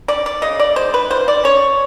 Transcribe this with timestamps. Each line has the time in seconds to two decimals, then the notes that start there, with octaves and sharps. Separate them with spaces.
0.08 C#4 D5
0.26 D5
0.42 C#3 D#5
0.60 D5
0.76 G#3 C5
0.94 B4
1.10 F3 C5
1.28 D5
1.44 C#4 C#5